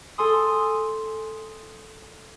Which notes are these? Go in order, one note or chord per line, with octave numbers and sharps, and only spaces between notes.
A4 G#5 C6 D#6